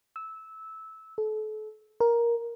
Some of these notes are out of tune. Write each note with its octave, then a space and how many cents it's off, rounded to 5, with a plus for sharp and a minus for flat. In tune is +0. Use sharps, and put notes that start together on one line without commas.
E6 -15
A4 -35
A#4 +10